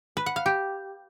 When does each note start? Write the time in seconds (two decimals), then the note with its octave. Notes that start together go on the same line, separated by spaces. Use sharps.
0.17 B4
0.26 F#5
0.36 F5
0.46 G4